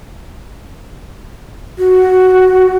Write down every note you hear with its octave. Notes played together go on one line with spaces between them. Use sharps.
F#4